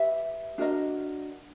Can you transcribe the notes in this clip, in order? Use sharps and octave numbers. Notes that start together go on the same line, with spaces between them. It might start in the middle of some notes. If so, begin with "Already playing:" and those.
Already playing: G4 B4 E5
D4 F#4 A#4 D#5